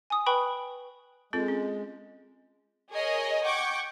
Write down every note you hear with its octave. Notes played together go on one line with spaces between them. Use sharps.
G#5 D#6
B4 G5 B5 C#6
G#3 C4 F4 A4
C#4
G#4 A#4 C#5 D#5 G#5
F#5 G5 C#6 D6 G6 G#6